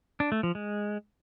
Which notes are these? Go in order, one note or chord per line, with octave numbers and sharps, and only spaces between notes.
D4
A3
F3
G#3